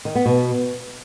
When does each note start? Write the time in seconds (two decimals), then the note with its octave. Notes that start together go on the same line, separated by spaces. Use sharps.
0.05 D#3
0.15 B3
0.26 B2